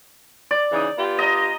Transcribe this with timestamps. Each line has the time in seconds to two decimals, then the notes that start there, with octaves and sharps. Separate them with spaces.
0.51 D5
0.72 C#3 E3 D#4
0.97 B3 F4 G4
1.19 D#5 A#5